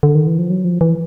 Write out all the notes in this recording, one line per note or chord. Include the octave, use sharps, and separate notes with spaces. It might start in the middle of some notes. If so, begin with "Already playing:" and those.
D3
D#3
E3
F3
F#3
F3
E3